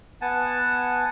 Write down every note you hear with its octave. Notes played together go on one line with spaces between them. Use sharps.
B3 F#5 G#5 A5